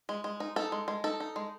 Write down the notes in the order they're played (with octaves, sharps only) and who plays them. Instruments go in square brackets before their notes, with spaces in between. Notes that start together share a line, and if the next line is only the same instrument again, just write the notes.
[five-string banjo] G#3
G#3
D#4
D#4 A4
G#3
G#3
D#4 A4
D#4
G#3